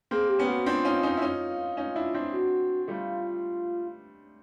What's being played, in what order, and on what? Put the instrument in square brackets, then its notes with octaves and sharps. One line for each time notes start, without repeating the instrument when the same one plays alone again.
[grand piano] A#3 C4 [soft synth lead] G#4
[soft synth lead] G4
[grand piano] B3 C#4
[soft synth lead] F#4
[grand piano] C4 D4 [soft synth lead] F4
[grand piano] C#4 D#4
C#4 D#4
E4
C#4 D#4
C#4 D#4
D4 E4
C4 D4
[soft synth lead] F#4
[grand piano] G3 A3 [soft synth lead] F4